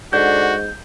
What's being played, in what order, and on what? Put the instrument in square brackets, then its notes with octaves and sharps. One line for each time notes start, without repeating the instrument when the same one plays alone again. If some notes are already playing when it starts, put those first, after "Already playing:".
[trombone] G#2 [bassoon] D3 [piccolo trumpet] F#4 [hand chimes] G6